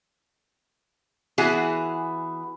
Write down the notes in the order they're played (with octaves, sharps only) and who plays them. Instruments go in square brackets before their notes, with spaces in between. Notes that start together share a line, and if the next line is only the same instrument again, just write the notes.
[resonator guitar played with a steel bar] E3 B3 E4 F#4 G#4